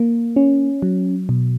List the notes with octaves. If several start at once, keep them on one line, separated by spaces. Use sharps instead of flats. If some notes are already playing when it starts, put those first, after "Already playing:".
Already playing: A#3
C#4
F#3
B2